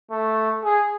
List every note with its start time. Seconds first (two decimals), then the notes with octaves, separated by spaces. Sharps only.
0.11 A3
0.64 G#4